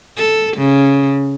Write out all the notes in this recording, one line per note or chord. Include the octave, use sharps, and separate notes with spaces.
A4
C#3